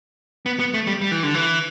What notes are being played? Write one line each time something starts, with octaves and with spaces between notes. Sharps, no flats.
B3
B3
A3
G3
G3
E3
D3
E3